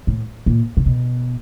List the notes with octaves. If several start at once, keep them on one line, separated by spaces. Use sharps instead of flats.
A2
A#2
C3
B2